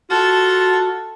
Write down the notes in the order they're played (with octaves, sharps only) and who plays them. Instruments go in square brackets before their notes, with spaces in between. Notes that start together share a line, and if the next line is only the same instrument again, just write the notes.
[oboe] F4 [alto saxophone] F#4 [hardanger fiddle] A4